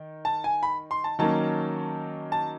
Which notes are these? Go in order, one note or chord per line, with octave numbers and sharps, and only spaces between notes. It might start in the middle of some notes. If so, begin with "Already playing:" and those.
Already playing: D#3
A5
G#5
B5
C6
A5
D#3 F#3 A#3 C#4 A5
A5